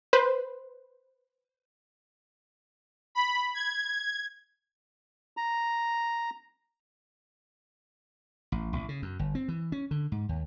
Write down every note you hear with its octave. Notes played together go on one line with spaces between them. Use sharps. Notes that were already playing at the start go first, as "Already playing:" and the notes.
B4 C5
B5
G#6
A#5
A1
A1
C#3
F#2
G1
C4
E3
C#4
D3
G#2
D#2